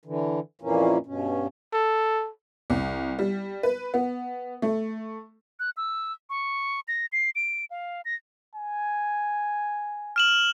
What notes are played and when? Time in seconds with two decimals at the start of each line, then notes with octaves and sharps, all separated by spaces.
0.05 D3 E3
0.62 F2 A#2 E3 A#3 C#4
1.06 G2 B2 C#4
1.73 A4
2.70 C2
3.19 G3
3.63 B4
3.94 B3
4.62 A3
5.60 F#6
5.77 E6
6.30 C#6
6.88 A#6
7.13 C7
7.36 D7
7.71 F5
8.05 A#6
8.55 G#5
10.16 F6 E7 F#7